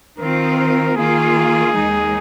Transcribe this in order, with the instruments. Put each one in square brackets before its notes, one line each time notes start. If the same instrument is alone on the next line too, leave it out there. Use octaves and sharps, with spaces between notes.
[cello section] D#3 C4 F4 [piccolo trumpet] A#4
[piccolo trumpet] A#4
[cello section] D#3 A#3 F4 [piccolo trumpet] G#4
[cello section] D#2 D#3 G#3 D#4